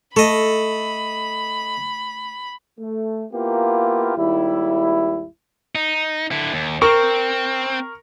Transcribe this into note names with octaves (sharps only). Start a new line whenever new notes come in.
A3 A4 D#5 B5
A3
A#3 B3 E4 F4 G4 A#4
G#1 D#2 G3 E4
D#4
D3 E4
D#2
C4 A#4 C#6